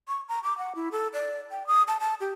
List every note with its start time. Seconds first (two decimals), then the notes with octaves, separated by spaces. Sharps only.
0.08 C#6
0.29 A#5
0.44 D6
0.58 F#5
0.75 E4
0.92 A4
1.13 D5
1.51 G5
1.67 D#6
1.88 A5
2.00 A5
2.21 G4